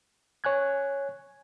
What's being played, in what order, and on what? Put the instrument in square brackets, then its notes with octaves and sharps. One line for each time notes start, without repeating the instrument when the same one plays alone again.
[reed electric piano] C#5 G#5 F#6 G#6